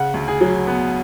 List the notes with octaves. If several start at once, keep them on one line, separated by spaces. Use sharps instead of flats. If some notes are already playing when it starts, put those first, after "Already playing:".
Already playing: C#3 F#5
D2
G#4
F#3
B3